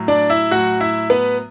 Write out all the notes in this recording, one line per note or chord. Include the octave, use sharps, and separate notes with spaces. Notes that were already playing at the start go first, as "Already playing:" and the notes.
Already playing: A2 F#3
D4 D5
E4 E5
A2 F#3 F#4 F#5
E4 E5
B3 B4